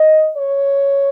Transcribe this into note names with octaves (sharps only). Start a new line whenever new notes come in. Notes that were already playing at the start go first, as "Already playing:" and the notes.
Already playing: D#5
C#5